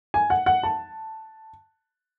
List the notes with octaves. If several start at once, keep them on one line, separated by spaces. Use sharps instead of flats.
G#5
F#5
F#5
A5